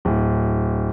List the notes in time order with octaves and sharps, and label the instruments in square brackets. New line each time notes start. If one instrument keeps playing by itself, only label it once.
[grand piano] D1